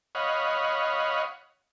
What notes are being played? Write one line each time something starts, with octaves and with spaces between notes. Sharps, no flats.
C#5 D#5 F5 F#5 B5